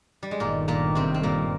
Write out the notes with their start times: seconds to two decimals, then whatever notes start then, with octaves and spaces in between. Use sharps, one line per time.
0.23 G3
0.31 G#3
0.40 G1 G2 A#2 D#3 A#3
0.68 A#2 A#3
0.95 C3 C4
1.14 C4
1.23 A#2 A#3